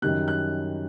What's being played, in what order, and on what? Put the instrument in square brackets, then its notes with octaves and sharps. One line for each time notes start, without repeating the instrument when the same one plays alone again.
[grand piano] F#2 D#3 G3 F#6
F#6